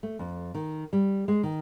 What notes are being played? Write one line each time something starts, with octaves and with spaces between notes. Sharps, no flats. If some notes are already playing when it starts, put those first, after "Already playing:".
A3
F2
D#3
G3
G#3
D#3